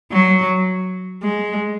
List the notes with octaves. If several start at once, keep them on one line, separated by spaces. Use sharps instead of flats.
F#3
G#3